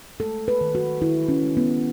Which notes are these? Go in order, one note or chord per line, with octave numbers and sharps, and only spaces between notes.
G#3 A4
B4
D#3
F#4
D#3 E4
C#4
G#3
B3